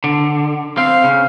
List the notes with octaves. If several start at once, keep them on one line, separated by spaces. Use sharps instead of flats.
D3
C4 F5
C#3